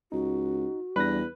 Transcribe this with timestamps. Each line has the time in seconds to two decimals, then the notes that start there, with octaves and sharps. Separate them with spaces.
0.12 C#2 D#4 F#4
0.96 E2 G3 D4 B4 A#6